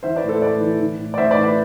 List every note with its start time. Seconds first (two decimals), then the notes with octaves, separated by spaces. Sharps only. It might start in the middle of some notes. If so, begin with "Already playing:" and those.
0.03 E3 C5 E5
0.16 B4 D5
0.23 A2
0.28 A4 C5
0.42 A2 B4 D5
0.60 E3
0.80 E3
0.99 A2
1.14 D5
1.18 A2 C5 E5
1.30 B4 D5
1.37 E3
1.43 B4 D5